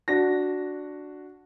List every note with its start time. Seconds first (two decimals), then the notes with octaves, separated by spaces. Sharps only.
0.08 D4 F#4 A#6